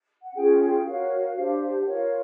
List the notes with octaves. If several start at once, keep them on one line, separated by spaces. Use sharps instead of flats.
F#5
C#4 F4 G#4 G5
G5
F#4 A#4 C#5 F5
D4 G4 C5
F#5
F4 A#4 C#5 F5